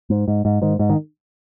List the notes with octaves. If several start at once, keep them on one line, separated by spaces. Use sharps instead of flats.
G#2
G#2
G#2
G#2 D#3
G#2
D#3